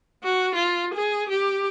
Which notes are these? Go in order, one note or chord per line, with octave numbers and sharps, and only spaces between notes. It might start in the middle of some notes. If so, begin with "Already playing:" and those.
F#4
F4
G#4
G4